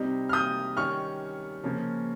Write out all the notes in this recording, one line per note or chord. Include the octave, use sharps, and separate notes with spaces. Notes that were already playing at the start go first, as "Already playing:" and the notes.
Already playing: C3 G3 C4 D#4
F6
D#6 G6
D#3 G3 C#4 C#6 F6
C#3 F3 A#3 C#4